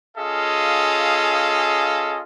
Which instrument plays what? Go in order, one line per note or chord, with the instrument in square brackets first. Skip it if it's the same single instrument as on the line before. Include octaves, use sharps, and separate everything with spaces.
[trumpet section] C#4 F4 G#4 A4 D#5 F5